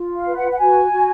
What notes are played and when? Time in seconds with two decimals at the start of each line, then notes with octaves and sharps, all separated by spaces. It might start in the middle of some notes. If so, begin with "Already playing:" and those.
Already playing: F4
0.16 F5
0.26 B4
0.37 F#5
0.51 F#5
0.59 F#4 G#5
0.91 F#4